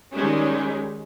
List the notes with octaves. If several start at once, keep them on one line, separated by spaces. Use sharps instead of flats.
D#3 G3 G#3 C#4